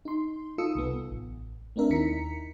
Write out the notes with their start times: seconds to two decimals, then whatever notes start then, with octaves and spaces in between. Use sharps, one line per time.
0.05 D#4 C6
0.58 D#4 F4 A4 D#6 E6 C#7
0.75 C2 B3
1.10 A1
1.76 A3 C4 D4 A#4 E5
1.90 D#2 D#4 E4 A#5 B6 C#7